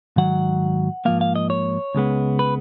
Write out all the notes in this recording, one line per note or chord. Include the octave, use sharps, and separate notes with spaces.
G#2 D#3 F#3 F#5
G#2 F3 A#3 F5
F5
D#5
C#5
C#2 C#3 G#3 B3
B4